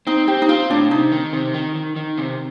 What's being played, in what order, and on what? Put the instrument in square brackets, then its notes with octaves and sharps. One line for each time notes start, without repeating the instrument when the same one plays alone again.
[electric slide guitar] C4 [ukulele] D#4
[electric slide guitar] C4 [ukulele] G4
[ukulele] D#4
[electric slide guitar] C4 [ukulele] F4
[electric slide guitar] A2 [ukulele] D4
[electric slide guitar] C3 [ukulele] D#4
[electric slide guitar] D#3
C3
D#3
D#3
D#3
C3